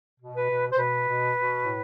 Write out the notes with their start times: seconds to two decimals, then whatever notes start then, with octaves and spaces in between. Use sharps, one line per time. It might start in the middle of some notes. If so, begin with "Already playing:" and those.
0.20 B2
0.35 B4
0.50 B2
0.72 C5
0.78 B2 B4
1.07 B2
1.36 B2
1.65 A2